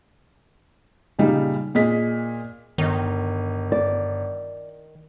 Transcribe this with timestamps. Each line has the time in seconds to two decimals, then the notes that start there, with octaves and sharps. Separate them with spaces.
1.19 A#2 C#3 G3 D#4
1.75 A#2 G#4 D#5 B6
2.78 G1 D#3 D#5
3.72 D5